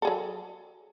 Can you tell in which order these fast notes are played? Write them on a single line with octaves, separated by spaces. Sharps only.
A4 G#4 F#3